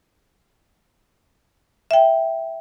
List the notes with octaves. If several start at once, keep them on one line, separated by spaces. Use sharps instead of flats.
E5 G5